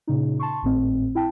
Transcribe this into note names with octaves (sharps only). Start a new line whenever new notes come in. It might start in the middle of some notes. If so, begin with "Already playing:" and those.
A#2 C#3 D#4
A5 C6 C#6
G#1 A2 C4
E4 G5 A5